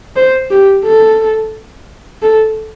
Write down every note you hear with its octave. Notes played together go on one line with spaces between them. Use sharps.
C5
G4
A4
A4